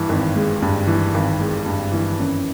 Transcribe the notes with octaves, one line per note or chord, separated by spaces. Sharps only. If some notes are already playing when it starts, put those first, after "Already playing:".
Already playing: G2 E3
G#1
G#3
G2
E3
G#1
G#3
G2
E3
F#2